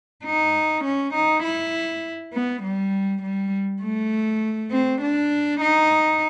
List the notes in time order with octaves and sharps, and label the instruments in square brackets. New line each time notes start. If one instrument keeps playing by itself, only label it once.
[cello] D#4
C#4
D#4
E4
B3
G3
G3
A3
C4
D4
D#4